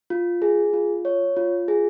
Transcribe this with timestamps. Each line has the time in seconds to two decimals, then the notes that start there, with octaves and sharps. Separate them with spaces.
0.10 F4
0.42 G#4
0.73 F4
1.05 C#5
1.37 F4
1.68 G#4